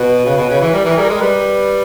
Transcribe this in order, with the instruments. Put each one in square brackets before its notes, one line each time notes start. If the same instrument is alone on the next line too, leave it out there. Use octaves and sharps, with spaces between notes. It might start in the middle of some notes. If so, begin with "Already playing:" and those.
Already playing: [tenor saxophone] B2 [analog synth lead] B4
[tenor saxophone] C#3
B2
C#3
[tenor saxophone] E3 [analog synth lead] B4
[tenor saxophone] G3 [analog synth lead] A#4
[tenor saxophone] E3 [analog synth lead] A#4
[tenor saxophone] G3 [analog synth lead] G#4
[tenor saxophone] G#3 [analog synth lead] A#4
[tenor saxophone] G3 [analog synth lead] B4